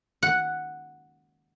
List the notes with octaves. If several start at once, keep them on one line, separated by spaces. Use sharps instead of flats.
F#5